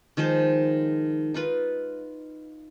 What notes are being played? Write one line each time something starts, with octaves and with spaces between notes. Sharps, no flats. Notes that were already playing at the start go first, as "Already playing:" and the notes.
D#3 F3 G#3 C5
D#4 F4 B4